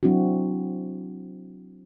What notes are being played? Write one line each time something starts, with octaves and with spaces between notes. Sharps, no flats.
F#3 C4 D4 E4 F#4